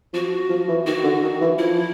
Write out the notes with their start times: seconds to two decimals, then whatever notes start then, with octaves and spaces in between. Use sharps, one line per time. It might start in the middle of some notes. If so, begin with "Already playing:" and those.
0.13 F3 F#4
0.49 F3
0.68 E3
0.86 D#3 F#4
1.03 D3
1.23 D#3
1.41 E3
1.58 F3 E4